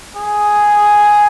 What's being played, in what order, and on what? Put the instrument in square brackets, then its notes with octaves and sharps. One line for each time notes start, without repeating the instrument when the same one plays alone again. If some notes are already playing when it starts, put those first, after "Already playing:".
[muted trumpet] G#4